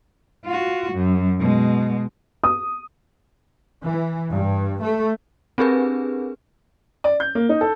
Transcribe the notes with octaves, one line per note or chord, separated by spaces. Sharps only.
F4 F#4
F#2
B2 G#3
D#6
E3
G2
A3
C4 D4 G4 G#4 A#4 B4
D5
G6
A#3
D#4
A4